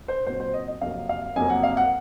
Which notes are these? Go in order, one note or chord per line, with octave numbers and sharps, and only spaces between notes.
C5
A#2 F#3 C4 C5
C5
D#5
D#5
F2 C3 F#3 A#3 F5
F5
F2 C3 F#3 A#3 G#5
F#5
F5
F#5